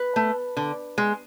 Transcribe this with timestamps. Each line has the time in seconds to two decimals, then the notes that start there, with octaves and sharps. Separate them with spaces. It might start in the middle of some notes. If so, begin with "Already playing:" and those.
Already playing: B4
0.16 A3
0.57 D3
0.98 G#3